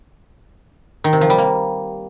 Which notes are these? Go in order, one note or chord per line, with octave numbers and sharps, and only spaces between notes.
D#3
C3
F3
G3
A#3